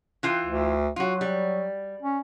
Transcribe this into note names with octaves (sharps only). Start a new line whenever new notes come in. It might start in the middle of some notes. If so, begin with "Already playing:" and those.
E3 F4 G5
D2
F#3 F4 F#4
G3
C#4